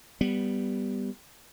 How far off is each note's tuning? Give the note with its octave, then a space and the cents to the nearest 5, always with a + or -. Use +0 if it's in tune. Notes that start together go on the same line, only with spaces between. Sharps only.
G3 +0 B3 +0